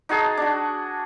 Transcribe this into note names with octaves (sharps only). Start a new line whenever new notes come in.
D#4 F#4 G#4 A5
D4 F#4